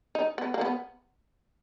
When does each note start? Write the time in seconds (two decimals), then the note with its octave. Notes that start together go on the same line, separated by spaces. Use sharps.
0.15 D#4
0.38 B3
0.54 A#3
0.61 B3